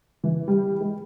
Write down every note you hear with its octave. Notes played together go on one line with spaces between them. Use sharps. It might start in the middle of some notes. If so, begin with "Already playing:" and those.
E3
G3
G#3